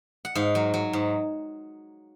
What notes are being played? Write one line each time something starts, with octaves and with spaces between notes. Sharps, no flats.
F#5
G#2 F5
F#3
F#3
G#2